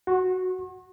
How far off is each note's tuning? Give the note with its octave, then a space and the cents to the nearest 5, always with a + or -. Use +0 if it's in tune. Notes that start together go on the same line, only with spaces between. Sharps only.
F#4 +0 C#6 -45